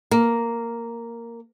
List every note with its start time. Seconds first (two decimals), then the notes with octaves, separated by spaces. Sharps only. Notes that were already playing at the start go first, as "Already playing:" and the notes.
0.11 A#3